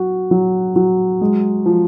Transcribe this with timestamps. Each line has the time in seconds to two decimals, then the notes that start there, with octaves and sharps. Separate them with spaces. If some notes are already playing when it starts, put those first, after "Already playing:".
Already playing: F#3 F#4
0.31 F#3
0.76 F#3
1.21 G#3
1.66 F3